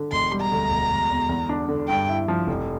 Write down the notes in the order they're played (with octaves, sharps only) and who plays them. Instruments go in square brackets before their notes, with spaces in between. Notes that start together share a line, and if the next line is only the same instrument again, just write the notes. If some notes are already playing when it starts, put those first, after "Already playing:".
Already playing: [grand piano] D3
[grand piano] E1 [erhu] C6
[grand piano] G3
[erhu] A#5
[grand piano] D2
E1
E1
E2
E2
D4
D3
[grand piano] G2 [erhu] G5
[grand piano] E4
F3
F1